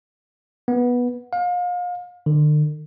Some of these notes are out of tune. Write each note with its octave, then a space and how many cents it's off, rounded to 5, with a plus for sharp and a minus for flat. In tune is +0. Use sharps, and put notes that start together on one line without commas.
B3 -15
F5 +35
D3 +40